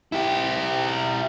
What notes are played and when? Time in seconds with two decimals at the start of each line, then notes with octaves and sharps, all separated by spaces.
0.12 E4 G4